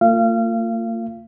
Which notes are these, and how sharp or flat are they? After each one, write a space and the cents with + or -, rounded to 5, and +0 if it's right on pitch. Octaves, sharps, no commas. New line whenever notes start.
A#3 -45 F4 +0 F5 -30